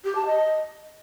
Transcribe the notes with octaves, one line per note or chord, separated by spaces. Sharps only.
G4
A5
D#5